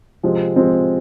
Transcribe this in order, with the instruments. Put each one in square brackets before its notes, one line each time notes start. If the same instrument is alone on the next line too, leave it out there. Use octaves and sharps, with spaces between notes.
[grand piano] C3 F3 G#3 C4
C3 F3 G#3 C4